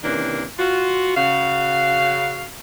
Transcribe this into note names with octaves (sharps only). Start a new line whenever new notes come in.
C3 D#3 E3 A#3 C#4 D4
F4 F#4
C#3 F#4 F5